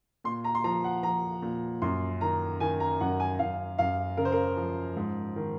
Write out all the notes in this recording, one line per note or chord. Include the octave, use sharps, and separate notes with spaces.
A#2 C6
A#5
C6
F3 A#5
F#5
F3 A#5
A#2
F#2 C6
D#3 A#5
D#3 G#5
A#5
F#2 F#5
G#5
F#2 F5
F#2 F5
C#3 A#4
C5
A#4
F3
G#2
D#3